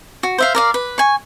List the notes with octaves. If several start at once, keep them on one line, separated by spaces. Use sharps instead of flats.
F#4
C5 E5 F5
A#4 D5 F5
B4
G#5 C#6